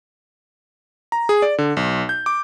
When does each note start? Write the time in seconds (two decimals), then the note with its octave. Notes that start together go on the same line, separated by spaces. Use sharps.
1.12 A#5
1.29 G#4
1.42 D5
1.58 D3
1.77 B1
2.09 G6
2.26 D6